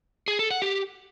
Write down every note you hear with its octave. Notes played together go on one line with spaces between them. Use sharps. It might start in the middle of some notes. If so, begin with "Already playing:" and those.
G#4
A4
F#5
G4